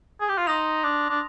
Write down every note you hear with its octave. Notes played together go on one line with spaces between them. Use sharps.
G#4
G4
F4
D#4 C6 D#6 A#6 F7
D4
D4